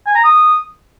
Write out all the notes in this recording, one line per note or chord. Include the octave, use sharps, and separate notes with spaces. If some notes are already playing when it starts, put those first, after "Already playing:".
G#5
A#5
D#6